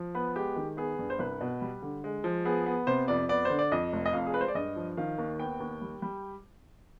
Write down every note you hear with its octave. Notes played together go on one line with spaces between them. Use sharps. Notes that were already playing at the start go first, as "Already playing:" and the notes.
Already playing: F3
B3 B4
G#3 G4
D#3
B3 G#4
G2
C5
C2 B4
B2
G3
D3
G#3
F3
B3 G#4
B3
C3 C5
F2 D5
B3 D5
D3 C5
D5
F2 D#5
F1
D#5
F2 F5
G#4
G#3 B4
C5
D5
G2 D#5
F3
D#3 F5
D#2
B3 G5
D#2
G3
G3